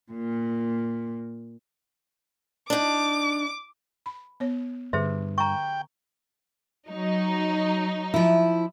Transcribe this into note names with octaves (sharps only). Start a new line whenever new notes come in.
A#2
D4 D#4 D6
B5
B3 C#5
G2 D3 G#4 C5 E5
G5 A#5 C#6
F#3 D#4
F3 E4